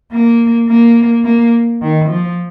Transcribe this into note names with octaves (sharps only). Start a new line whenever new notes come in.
A#3
A#3
A#3
D#3
F3